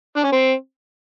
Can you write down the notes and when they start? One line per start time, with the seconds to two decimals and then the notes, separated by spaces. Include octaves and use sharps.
0.16 D4
0.24 C#4
0.32 C4